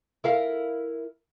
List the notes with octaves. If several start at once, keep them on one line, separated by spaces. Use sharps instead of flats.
E4 A#4 F5